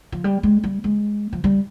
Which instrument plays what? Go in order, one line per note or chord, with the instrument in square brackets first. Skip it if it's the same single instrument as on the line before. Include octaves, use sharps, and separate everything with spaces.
[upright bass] F3
G3
G#3
G3
G#3
F3
G3